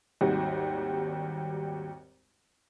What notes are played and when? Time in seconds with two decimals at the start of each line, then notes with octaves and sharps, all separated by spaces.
0.21 G#1 D#2 G3 F#4